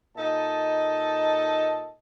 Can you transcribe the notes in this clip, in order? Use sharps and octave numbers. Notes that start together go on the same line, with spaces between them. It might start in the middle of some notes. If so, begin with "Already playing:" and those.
A#2 D#4 A4 D#5 A5